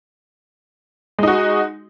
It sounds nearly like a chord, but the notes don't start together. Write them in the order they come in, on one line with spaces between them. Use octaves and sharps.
G#3 D#4 F#4